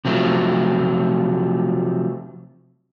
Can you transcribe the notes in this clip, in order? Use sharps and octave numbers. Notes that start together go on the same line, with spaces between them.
C3 F3 F#3 A3